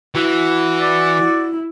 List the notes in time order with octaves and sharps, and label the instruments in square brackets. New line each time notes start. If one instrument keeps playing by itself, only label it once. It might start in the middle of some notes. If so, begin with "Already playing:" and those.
[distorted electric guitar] E3 [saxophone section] F#4
[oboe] D5
[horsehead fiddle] E4